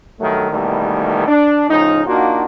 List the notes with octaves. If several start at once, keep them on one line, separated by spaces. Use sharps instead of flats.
G2 D#3 F#3 A3
D#2 B2 D#3 E3 G3 A3
D4
A2 C#3 F3 D#4
A#3 D4 D#4 F4 F#4